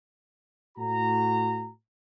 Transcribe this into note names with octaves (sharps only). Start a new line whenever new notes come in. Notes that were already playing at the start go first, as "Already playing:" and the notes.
A2 F#4 A#5